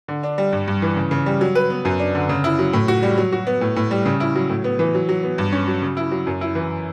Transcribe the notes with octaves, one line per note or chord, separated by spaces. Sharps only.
D3
D4
G3
G2
G2
E3
C#3
C#3
G3
F#3
B4
B3
F#2
D4
D3
C#3
E4
F#3
A2
F#4
G3
F#3
F#4
B3
A2
A2
G3
C#3
E4
F#3
A2
B3
E3
F#3
F#3
B3
G2
C#4
F#3
C#3
E4
F#3
F#2
E4
E3